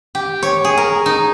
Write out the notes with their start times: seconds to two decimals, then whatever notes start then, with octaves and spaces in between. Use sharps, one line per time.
0.15 G4
0.43 C#5
0.65 G#4
0.78 A#4
1.06 D#4